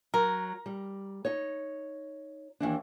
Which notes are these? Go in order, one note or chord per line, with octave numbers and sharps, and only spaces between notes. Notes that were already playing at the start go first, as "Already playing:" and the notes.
F#3 A#4
G3
D#4 C#5
D#2 E3 D4